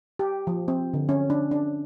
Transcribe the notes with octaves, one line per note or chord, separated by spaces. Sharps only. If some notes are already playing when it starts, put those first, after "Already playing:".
G4
F3
C4
D3
C#4
D4
D4